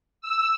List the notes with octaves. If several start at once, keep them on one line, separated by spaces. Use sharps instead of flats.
E6